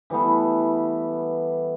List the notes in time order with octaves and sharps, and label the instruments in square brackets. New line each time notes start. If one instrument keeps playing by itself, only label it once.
[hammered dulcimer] E3 G3 A3 B3